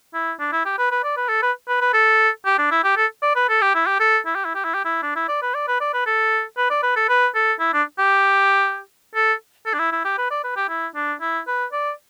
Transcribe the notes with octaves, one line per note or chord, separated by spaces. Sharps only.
E4
D4
E4
G4
B4
B4
D5
B4
A4
B4
B4
B4
A4
G4
D4
E4
G4
A4
D5
B4
A4
G4
E4
G4
A4
E4
G4
E4
G4
E4
G4
E4
D4
E4
D5
B4
D5
B4
D5
B4
A4
B4
D5
B4
A4
B4
A4
E4
D4
G4
A4
A4
D4
E4
E4
G4
B4
D5
B4
G4
E4
D4
E4
B4
D5